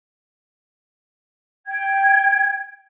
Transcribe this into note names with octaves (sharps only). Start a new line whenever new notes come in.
G5 G#6